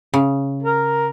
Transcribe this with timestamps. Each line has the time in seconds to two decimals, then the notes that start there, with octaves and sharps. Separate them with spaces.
0.14 C#3
0.63 A#4